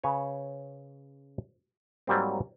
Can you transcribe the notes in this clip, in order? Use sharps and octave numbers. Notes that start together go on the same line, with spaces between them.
C#3 B4 C#5
G#2 F#3 G3 A#3 C4